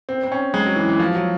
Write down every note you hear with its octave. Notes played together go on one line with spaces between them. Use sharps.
C4
C4
C#4
G#3
F#3
E3
E3
F3
F#3